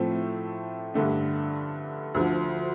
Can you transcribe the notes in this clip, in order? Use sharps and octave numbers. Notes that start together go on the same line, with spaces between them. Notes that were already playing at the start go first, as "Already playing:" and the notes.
Already playing: A2 F3 A3 C4
G2 D3 A3 D4
D2 D3 F3